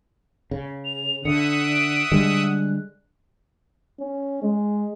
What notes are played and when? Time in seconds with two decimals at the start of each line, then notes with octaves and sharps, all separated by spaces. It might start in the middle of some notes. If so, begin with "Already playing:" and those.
0.51 C#3
0.85 F7
1.25 D3 E5 F#5 D#6 C#7
1.63 D7
2.11 D3 G3 G#3 D7
2.46 F#6
3.99 C#4
4.42 G#3